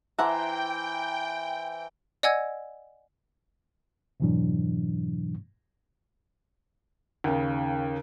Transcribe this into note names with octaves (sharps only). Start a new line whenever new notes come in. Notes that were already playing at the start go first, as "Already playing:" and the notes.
E3 C5 E5 F#5 G5 A5 A#5
D5 D#5 F#5 G#5 E6 G#6
F2 G#2 B2 E3 F#3 D4
D#2 C#3